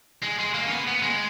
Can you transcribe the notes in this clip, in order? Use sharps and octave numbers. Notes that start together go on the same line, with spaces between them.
G#3
G#3
A#3
C#4
B3
B3
G#3